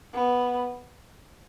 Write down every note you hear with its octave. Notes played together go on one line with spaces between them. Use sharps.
B3